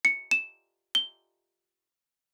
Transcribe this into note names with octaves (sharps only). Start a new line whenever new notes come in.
C#7
E7
G7